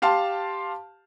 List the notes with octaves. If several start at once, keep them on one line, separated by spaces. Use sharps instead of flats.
G4 F5 A5 C6